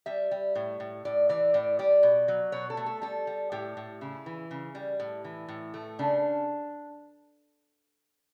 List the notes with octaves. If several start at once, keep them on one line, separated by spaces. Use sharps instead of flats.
G3 E5
G3
A2
A2
A2 D5
E3 D5
A2 D5
G3 D5
B2
F#3
B2 C#5
A4
A3
A4
G3 A4
G3
A2 G4
A2
C#3 E4
E3
C#3
G3
A2
E3
A2
A3
C#3 D4